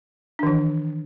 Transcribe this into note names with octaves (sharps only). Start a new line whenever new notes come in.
D#3 E3 D4